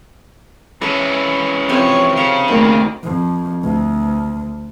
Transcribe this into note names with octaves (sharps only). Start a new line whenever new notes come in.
E3 G#3 C#4 A4 C#6
C3 F3 C4 C#5 G#5
C#3 D#4 A#4 A#5
D2 D#3 A#3 C4
F2
D2